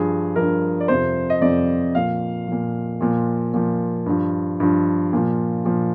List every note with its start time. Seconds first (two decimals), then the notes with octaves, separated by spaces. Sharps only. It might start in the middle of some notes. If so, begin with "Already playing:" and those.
Already playing: G2 F3 G#4
0.36 G2 F3 A#4
0.80 D5
0.88 F2 C3 F3 C5
1.30 D#5
1.42 F2 C3 F3 D5
1.95 A#2 F3 F5
2.48 A#2 F3
3.01 A#2 F3
3.54 A#2 F3
4.06 G2 F3
4.60 G2 F3
5.13 A#2 F3
5.65 A#2 F3